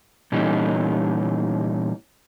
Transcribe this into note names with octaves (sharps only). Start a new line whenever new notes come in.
A#2 E3 G3 C#4 D#4